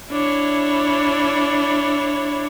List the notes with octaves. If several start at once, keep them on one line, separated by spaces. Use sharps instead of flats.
D4 E4 C#5